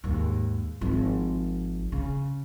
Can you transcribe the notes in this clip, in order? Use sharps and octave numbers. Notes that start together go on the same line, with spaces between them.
D#2 G#2
G#1 F3
C#3